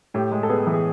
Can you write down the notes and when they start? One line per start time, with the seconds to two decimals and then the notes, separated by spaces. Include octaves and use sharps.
0.14 A2 G4
0.32 G#3
0.43 A4
0.49 B3 G#4
0.67 E3
0.74 G#4